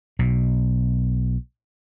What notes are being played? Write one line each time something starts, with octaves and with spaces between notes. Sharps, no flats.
B1 B2